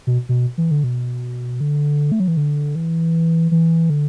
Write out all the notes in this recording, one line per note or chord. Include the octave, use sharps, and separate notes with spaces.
B2
B2
E3
D3
B2
D3
A3
F#3
E3
D3
E3
E3
D3